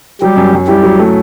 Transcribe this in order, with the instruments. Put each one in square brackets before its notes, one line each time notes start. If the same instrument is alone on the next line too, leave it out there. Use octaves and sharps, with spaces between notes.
[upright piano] F#3 [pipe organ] G3 G4
[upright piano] F#2
F#2
[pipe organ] G3 G4 [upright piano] E4
[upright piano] F#3
A3